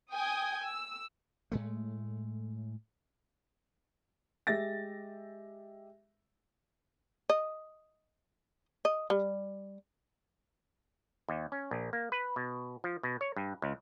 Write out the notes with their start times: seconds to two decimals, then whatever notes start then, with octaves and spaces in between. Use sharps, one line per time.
0.13 G5 G#5 D#6 G6 G#6
0.63 E6
1.52 A2 G#3 A3
4.47 G#3 G4 E5 A6 A#6
7.30 D#5
8.85 D#5
9.10 G3
11.29 D#2
11.52 C#4
11.71 A#1
11.93 A#3
12.12 B4
12.36 B2
12.84 F3
13.03 B2
13.21 C#5
13.36 G2
13.62 C#2